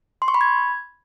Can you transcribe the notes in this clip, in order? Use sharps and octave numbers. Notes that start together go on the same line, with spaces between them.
C6
C#6
B5
G#6